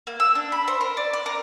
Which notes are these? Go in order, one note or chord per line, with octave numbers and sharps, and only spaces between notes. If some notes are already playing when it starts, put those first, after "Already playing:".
A#3
E6
D4
B5
C5
A#4
D5
D5
A#4